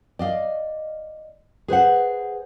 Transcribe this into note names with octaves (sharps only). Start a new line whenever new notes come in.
D5 D#5 F5
G#4 B4 C5 F#5